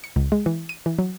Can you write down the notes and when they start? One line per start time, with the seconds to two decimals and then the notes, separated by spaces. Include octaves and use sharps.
0.04 C#7
0.16 C#2
0.32 G#3
0.46 E3
0.69 D#7
0.86 E3
0.99 F#3